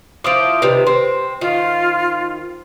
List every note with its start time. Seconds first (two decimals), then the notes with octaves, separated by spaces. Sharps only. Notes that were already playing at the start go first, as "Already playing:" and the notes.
0.24 F3 E4 F4 D6 D#6 D7
0.62 C3 D#3 G3 B4
0.87 C4 C5 C6
1.41 D#3 F4